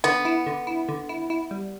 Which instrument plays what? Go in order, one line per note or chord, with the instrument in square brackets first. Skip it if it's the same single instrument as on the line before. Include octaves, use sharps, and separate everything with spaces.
[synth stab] D3 [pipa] B3
[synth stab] E4
D3
E4
D3
E4
E4
G3